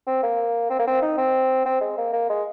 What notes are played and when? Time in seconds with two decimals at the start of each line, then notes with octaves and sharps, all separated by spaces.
0.07 C4
0.23 A#3
0.70 C4
0.79 A#3
0.88 C4
1.02 D#4
1.18 C4
1.66 C4
1.81 G#3
1.98 A#3
2.13 A#3
2.29 G#3